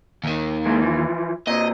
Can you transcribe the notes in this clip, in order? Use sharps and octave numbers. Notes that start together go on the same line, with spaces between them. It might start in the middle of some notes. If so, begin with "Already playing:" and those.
D#2 D#3
G#3 A#3 E4
E3 F3
A#2 C4 D#5